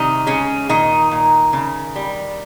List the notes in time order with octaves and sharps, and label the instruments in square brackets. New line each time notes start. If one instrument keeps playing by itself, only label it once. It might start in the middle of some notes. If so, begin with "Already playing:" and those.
Already playing: [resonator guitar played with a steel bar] C3 D#3 G3 D#4
C#3 G#3 C#4
A#2 D#3 D#4
A#2
C#3
G3